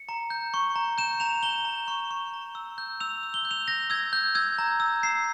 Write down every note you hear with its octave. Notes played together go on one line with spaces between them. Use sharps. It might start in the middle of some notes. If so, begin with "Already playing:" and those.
Already playing: C#7
A#5
G6
C#6
A#5
G6 E7
A#5 F7
A#5 G7
A#5
C#6
C#6
A#5
E6
G6
E6 F7
E6
G7
G6
F7
G6 A#6
E6 G#6
G6
E6 G#6
A#5
E6
A#5 C7